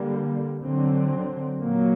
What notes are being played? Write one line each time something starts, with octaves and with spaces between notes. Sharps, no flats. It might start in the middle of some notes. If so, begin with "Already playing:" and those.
Already playing: D3 G3 A#3
D3 F#3 C4
A#2 F#3 A#3